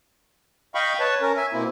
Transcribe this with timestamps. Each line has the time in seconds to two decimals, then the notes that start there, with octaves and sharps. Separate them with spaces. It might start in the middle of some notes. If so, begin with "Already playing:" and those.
0.75 D#5 F5 G5 B5 C#6
1.00 B4 C#5 A5
1.22 C#4 A#4
1.37 E5 G#5
1.53 B2 A#3 C4 E4